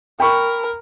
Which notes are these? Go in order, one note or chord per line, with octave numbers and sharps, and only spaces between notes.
A#4 G5 B5 C#6